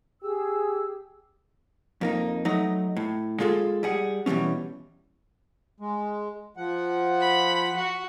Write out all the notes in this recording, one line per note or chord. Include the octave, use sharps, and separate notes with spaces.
G4 G#4 E6
F2 A#3 D#4
F#3 A3 D#4 D#5
A2
G#3 F4 G#4 A4
G3 G#4 F#5
B2 E3 G3 G#3 C#4
G#3
F3 F#5
B5
F#4